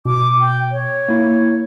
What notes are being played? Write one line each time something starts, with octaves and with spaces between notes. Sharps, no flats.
B2 D6
G5
C#5
A#3 E4